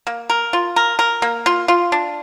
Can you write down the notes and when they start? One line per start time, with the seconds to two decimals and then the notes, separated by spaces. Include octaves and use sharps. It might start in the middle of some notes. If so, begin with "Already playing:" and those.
0.07 A#3
0.30 A#4
0.53 F4
0.76 A#4
0.99 A#4
1.22 A#3
1.46 F4
1.68 F4
1.92 D4